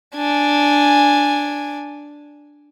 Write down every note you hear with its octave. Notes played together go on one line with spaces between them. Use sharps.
D4 G#5